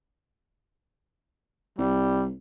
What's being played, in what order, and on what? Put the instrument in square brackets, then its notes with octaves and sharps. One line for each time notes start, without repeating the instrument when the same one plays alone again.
[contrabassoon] C2 [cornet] G3